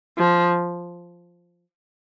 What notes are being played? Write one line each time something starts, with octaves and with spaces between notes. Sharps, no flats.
F3